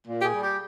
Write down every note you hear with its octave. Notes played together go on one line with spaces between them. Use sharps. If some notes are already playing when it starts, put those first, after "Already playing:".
A#2
G4
G#4
G3
G4